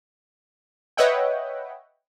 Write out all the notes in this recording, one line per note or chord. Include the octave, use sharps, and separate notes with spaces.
B4 C#5 D#5 E5 F#5 G5